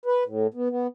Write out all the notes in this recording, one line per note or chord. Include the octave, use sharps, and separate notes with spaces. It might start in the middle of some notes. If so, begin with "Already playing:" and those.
B4
A2
B3
B3